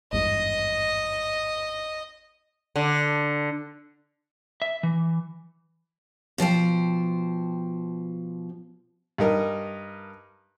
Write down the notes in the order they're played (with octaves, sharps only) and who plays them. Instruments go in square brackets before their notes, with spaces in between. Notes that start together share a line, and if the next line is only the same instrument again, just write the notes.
[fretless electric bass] G#1 E2 G2 [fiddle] D#5
[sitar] D3
[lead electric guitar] E5
E3
[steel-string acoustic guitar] B2 F3 C5 G5
[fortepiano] G2 D#4 A#4